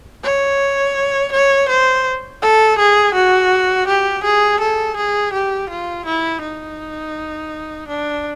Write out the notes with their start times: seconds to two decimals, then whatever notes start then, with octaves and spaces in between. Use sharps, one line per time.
0.24 C#5
1.32 C#5
1.69 C5
2.42 A4
2.79 G#4
3.15 F#4
3.88 G4
4.24 G#4
4.60 A4
4.97 G#4
5.33 G4
5.70 F4
6.06 E4
6.42 D#4
7.88 D4